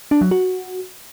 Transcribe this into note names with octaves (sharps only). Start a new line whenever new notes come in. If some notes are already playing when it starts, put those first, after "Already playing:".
D4
F#3
F#4